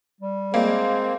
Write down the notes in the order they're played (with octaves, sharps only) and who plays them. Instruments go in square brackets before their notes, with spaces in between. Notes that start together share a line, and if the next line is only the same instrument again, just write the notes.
[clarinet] G3
[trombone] G#3 [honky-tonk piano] A#3 [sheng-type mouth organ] C4